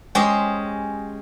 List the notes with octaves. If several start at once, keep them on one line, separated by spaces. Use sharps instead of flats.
G#3 C#4 G4 G#4 C5